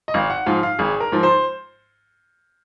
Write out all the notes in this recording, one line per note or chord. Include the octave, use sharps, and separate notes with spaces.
D#5
G#1 F5
F#5
G#2 F3 F5
F5
G#1 G#4
A#4
G#2 F3
C5